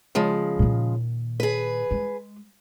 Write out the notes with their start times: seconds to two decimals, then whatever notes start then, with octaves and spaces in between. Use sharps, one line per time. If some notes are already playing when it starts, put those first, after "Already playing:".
0.15 C#3 F3 G#3
0.59 A#2 D#3
1.40 G#4 B4
1.91 G#3